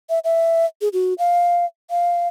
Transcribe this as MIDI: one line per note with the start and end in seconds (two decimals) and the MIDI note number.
0.10 0.19 76
0.24 0.66 76
0.81 0.88 68
0.93 1.13 66
1.18 1.65 77
1.90 2.28 77